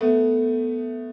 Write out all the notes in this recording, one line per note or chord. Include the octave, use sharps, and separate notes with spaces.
A3 B3